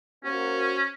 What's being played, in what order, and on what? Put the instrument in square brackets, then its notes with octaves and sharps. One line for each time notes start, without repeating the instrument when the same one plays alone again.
[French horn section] A#3 F#4 C5 [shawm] C#4